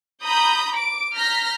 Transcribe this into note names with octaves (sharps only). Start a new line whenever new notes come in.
A#5 B5 D#6 G6
D6 D7
A#5 F6 G6 A#6 B6